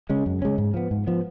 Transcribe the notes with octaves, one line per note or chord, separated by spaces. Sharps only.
C#3 G#3 C#4
F#2
C#3 G#3 C#4
G#2
F3 B3
G#2
F3 B3